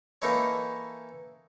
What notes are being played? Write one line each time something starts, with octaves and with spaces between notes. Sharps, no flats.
E3 A#3 D#4 E4 A4 C#5